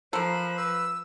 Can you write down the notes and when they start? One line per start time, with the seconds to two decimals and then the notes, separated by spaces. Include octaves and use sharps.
0.13 F3 A4 A#4 C5 B5 F#6
0.57 B4 E6